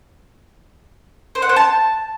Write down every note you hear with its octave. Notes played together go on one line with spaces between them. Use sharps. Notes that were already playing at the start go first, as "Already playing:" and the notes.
C5
F#5
C5
A5